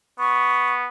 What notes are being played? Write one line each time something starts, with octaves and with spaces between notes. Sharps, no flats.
B3 C#6